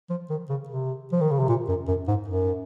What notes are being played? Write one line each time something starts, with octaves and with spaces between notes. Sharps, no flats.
F3
D#3
C#3
C3
F3
D#3
C#3
C3
A#2
F#2
F#2
G#2
F#2